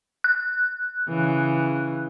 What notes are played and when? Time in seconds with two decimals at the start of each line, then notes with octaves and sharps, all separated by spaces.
0.24 F#6
1.09 C#3 E3